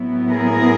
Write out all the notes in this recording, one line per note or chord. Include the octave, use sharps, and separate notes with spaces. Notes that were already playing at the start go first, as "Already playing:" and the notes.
Already playing: A2 F#3 B3 E4
G#4 A#4